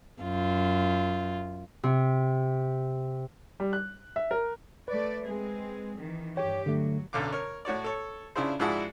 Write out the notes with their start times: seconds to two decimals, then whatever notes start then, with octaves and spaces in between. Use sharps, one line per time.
0.22 F#2 F4
1.83 C3
3.60 G3
3.73 F#6
4.16 E5
4.31 A#4
4.88 A3 B4 D5
5.23 G#3 C4 G#4
5.99 D#3 E3
6.37 G2 G4 C#5 G5
6.66 D3 F#3 A3
7.13 B1 F#2 D3 F5 D6
7.32 A#4 C#5
7.65 A2 F#4 C#5 D5
7.84 A4 C#5
8.36 C#3 D4 E4 F4 G#4 C5
8.60 G#2 F3 D4 E4 F#4 G#4